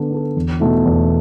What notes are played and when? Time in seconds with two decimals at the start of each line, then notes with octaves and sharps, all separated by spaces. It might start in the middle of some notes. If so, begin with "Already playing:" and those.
Already playing: D3 B3 D4 A4
0.11 B3 D4 A4
0.36 E2
0.60 B2 A3 E4
0.85 E2